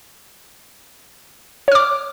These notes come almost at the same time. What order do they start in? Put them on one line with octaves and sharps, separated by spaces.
C#5 F6 D6